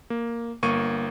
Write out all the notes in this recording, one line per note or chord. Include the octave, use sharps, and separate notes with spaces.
A#3
G1 A#3 C#6 D#7